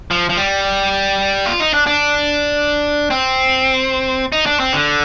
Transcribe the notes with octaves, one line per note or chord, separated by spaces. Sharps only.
F3
F3
G3
F4
D#4
D4
D4
C4
D#4
D4
C4
D3